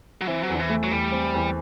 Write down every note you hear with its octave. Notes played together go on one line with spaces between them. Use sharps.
F#3
E3 C4
F#3
E2
D3
E3
A3
F#3
E2 G3
C4
E2